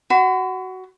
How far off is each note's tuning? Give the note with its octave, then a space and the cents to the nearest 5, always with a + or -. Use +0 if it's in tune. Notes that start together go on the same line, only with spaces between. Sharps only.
F#4 +15 B5 +45